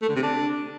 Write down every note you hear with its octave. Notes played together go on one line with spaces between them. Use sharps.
A3
D3
C3
D4